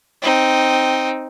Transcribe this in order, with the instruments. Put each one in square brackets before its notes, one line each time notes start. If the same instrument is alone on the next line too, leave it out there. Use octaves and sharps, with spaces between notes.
[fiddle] C4 D#4